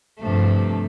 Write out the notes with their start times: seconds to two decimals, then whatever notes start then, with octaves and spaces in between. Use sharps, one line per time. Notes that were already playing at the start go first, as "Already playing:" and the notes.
0.20 G2 C3 F3 A3